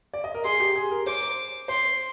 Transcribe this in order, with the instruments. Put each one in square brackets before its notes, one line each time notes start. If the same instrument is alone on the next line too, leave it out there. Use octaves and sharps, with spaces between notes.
[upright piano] D5
D#5
A#4
[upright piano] G#4 [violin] C6
[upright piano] G4
G#4
A#4
[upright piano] C5 [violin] D6
[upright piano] C5 [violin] C6